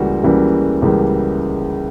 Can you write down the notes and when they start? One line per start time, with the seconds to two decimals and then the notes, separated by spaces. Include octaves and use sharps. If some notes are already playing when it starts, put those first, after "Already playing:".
Already playing: C#2 C#3 E3 G3 A#3 F#4
0.24 C#2 C#3 E3 G3 A#3
0.82 C#2 C#3 E3 G3 A#3